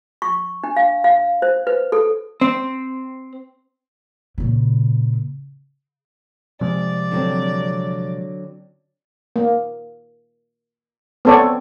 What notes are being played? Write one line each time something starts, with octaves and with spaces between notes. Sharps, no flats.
C#6
D4
F5
F5
C5
B4
A4
C4
A#2 C#3
C3 F3 G#3 D5
D3 F#3 C4
A#3
B3 C4 A4 C#5 D5